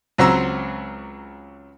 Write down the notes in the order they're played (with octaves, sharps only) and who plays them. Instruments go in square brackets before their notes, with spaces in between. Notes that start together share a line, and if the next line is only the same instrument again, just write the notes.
[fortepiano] C#2 F#3 C4 A#5 E6